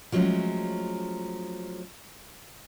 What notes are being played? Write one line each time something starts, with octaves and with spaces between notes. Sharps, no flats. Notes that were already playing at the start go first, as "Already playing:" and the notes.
F3 F#3 G#3 A3 C#4